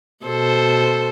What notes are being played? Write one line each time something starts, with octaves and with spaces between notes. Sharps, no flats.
B2 A4 C5